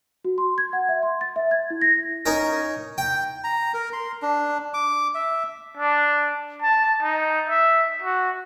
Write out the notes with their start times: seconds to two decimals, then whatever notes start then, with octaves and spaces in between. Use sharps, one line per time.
0.25 F#4
0.38 C6
0.58 G#6
0.73 F#5
0.89 E5
1.03 C6
1.21 A6
1.36 E5
1.51 G#6
1.70 E4
1.82 A#6
2.26 C#4 D#4 A#4
2.98 G5
3.44 A#5
3.74 A#4
3.93 C6
4.22 D4
4.74 D6
5.15 E5
5.77 D4
6.62 A5
7.02 D#4
7.49 E5
8.02 F#4